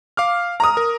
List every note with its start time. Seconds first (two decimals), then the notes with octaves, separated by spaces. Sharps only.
0.17 F5 D6 F6
0.60 A#5 D#6
0.77 A#4